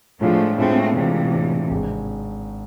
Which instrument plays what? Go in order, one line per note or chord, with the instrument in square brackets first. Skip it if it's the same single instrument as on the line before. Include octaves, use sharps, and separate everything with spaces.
[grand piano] A2 G#3 D4 F4 [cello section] F3 A3
[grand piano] A2 G#3 D4 F4 [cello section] A3 C4
[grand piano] A2 G#3 D4 F4 [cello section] C3 E3
[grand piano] A2 G#3 D4 F4
G#1 G#3 D4